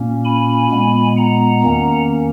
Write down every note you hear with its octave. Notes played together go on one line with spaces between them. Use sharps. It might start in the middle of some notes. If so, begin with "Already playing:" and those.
Already playing: A#2 A#3 C#4
G#5 B5
A#2 G#3 B3
F#5 A#5
E2 D#3 A#3 C#4